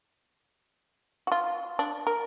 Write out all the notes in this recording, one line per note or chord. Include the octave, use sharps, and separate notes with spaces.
F4 F#4
D4
A#4